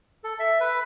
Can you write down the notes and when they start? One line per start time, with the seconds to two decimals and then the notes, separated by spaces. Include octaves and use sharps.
0.24 A4
0.39 E5
0.60 B4